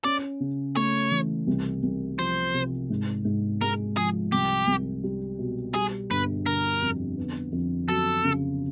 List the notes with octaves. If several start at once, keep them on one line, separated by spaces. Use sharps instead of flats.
C#4 D5
C#3
A3 C#5
E3
C2
C2
F3 C5
C3
G#2
G#2
G#3 A#4
F3 G#4
C2 G4
C2
G3
B2
G3 G#4
G1 B4
D3 A#4
F2
B3
F2
F#3 A4
C#3